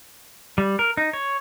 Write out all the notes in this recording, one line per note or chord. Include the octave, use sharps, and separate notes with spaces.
G3
A#4
D#4
C#5